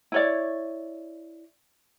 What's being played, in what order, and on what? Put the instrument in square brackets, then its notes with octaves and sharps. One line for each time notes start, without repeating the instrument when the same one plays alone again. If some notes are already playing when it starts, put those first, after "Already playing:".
[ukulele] E4 C#5 D5